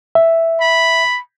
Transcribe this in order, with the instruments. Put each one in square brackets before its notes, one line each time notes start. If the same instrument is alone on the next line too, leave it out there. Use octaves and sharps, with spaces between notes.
[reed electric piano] E5
[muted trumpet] B5